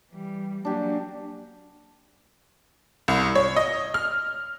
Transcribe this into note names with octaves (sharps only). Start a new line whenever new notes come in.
E3 G3
F#3 A#3 D4 G4 G#5
C2
C#5
D#5
F6